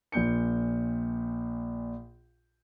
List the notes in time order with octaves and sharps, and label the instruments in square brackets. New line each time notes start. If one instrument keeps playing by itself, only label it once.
[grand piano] A#1 A#2 G6 C#7